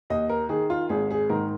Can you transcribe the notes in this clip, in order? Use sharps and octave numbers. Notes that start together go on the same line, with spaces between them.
D#2 D#5
A#4
D#3 G#4
F4
G#1 G#4
G#4
G#2 D#3 A#4